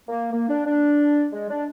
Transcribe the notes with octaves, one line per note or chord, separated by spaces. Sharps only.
A#3
A#3
D4
D4
G#3
D4